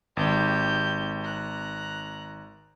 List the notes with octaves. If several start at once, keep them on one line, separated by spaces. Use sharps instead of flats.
G#1 G4 G6
A#5 F#6